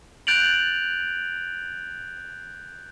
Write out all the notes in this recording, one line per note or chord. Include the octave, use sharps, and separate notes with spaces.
F#6 G6 A6 D7 F7 F#7